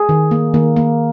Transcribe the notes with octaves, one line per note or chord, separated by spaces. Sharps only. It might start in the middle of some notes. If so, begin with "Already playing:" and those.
Already playing: G#4
D#3
A#3
D#3 A#3
A#3